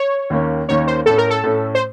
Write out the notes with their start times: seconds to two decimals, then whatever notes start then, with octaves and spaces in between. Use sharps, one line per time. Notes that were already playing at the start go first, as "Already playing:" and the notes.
Already playing: C#5
0.30 D#2 D#3 A#3 C#4
0.69 D#2 D#3 A#3 C#4 C#5
0.87 C5
1.06 A2 A3 C#4 A4
1.18 A#4
1.30 A4
1.44 A2 A3 C#4
1.75 C5